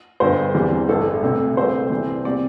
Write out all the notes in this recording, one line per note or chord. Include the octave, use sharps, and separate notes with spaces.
G1 G2 D3 C5
E2 E3 G3 C4
A1 G2 D3 A4
D2 C3 A3 C4
C2 C3 A3 C4 C5
C2 C3 E3
C3 G3 C4 D5